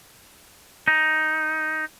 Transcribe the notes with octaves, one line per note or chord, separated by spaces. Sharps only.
D#4